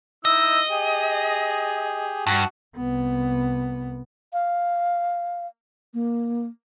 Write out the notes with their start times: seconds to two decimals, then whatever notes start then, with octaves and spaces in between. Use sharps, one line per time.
0.25 D#4 E4 D#5 E6
0.69 G4 G#4
2.27 G2 F#4 F#5 C#6
2.76 C2 B3
4.33 F5
5.94 A#3